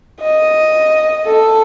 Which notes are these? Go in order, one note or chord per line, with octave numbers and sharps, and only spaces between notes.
D#5
A4